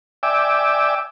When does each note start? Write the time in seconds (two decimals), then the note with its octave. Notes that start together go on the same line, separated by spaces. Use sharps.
0.23 D5 E5 G5 G#5 D6 E6